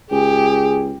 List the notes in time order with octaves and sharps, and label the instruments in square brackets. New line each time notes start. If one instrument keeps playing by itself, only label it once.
[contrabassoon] C#2 [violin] G4 [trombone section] G#4